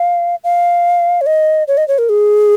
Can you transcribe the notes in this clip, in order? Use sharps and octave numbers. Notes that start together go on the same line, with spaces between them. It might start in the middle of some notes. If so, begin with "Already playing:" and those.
Already playing: F5
F5
C#5
D#5
C#5
D#5
C#5
A#4
G#4